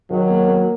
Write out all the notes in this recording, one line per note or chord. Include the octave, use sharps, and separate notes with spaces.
D#3 F#3
A#3
A#3